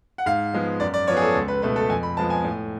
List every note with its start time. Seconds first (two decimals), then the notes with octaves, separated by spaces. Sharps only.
0.18 F#5
0.26 G#2 F5
0.54 F3 G#3 B3
0.80 F#2 D5
0.94 D5
1.07 F3 B3 C#5
1.17 G#4
1.22 A4
1.35 C#2 A4
1.48 B4
1.62 B2 A3 B4
1.76 A4
1.90 F2 G#5
2.03 B5
2.17 F3 G#3 B3 A5
2.30 G#5
2.44 A2